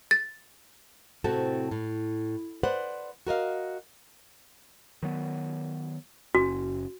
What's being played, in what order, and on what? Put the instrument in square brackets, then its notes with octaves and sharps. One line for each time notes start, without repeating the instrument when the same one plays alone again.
[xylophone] A6
[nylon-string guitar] A2 C3 C4 F#4 A4 A5
A2
B4 C5 D5 F#5
F#4 A#4 D#5 F5
[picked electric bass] D#3 F#3 B3
[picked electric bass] F#1 C#4 [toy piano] F#4